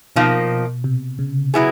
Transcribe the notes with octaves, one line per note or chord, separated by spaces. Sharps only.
B2 F3 A#3 D#4
C3
C#3
F#3 B3 E4 G#4